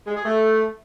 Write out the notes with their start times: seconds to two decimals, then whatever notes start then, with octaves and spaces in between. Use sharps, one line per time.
0.07 G#3
0.16 G#4
0.25 A3